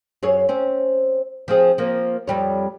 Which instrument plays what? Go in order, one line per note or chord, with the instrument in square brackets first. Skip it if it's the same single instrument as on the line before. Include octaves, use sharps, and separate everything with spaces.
[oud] F#2 G#4 C#5
C4 C#4
F3 C4 G#4
F3 A#3
F2 G3 C#5